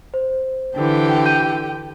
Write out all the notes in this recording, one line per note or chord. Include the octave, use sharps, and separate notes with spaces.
C5
D3 E3 G4 G5
G6 D#7